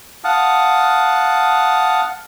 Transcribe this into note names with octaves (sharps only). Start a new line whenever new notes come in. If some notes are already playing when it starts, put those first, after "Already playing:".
F5 F#5 A5 D#6